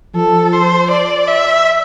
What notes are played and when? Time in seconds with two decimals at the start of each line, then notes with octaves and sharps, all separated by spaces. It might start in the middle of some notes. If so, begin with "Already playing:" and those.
0.15 F3 A4
0.53 C5
0.91 D5
1.28 E5